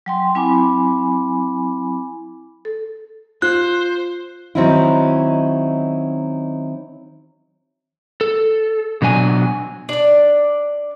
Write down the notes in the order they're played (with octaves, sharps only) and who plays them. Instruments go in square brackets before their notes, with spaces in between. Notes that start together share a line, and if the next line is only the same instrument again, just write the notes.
[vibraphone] F#3 G5 C6
F#3 C4 E4 G#5 B5 D6
A4
[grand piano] F4 [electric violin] C5 [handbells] F#6
[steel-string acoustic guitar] D#3 F#3 C4 C#4 D#4 E4
[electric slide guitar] A4
B2 F#3 D4 G#5
[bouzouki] D4 D5